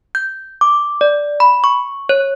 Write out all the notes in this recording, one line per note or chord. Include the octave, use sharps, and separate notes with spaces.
G6
D6
D5
B5
C#6
C#5